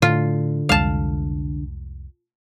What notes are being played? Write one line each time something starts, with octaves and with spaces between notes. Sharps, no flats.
A2 D3 F4
C2 F2 G#3 F5 A5